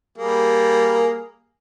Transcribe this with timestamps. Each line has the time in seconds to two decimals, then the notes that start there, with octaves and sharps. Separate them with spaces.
0.18 G3 A#3 G#4